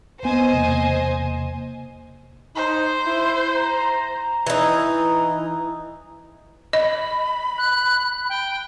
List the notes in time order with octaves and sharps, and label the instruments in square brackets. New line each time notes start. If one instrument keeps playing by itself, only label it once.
[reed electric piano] D2 B3 [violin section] C5 D#5 G#5
[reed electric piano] E2 C3 A#3
[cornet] D#4 [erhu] C5
[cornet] E4
A#5
[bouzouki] E3 D#4
[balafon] D#5 [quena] B5
[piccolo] F#6
G5